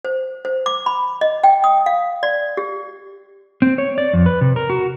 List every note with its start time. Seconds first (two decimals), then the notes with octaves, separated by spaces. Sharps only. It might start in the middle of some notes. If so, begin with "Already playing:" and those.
0.05 C5
0.45 C5
0.66 D6
0.86 B5
1.21 D#5
1.44 G5
1.64 D#6
1.86 F5
2.23 D5
2.57 G4
3.62 C4
3.78 C#5
3.98 D5
4.13 F2
4.26 B4
4.41 C3
4.56 A#4
4.70 F#4